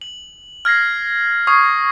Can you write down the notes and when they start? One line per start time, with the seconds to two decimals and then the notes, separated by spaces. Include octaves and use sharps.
0.01 F#7
0.65 F6 G#6 A#6 C7
1.47 C#6 D#6 G#6 C7